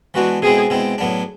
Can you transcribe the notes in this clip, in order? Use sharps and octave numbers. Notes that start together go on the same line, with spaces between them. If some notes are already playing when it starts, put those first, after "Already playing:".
E3 G#3 B3 D4 F#4
B2 G#3 C4 E4 G#4
B2 G#3 C4 E4
A2 F#3 B3 D4